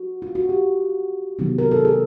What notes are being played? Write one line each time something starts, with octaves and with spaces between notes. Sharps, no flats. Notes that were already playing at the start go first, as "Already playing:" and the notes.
Already playing: F#4
F4
F#4
G4
C3 D#3 F#3 B3
A#4
A4
G#4